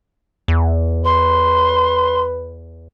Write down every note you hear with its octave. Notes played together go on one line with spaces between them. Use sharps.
E2
B4 C6